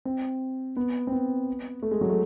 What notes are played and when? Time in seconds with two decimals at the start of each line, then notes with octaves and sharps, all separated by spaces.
0.05 C4
0.77 B3
1.07 C4
1.12 B3
1.83 A3
1.91 G#3
2.01 F#3
2.10 A3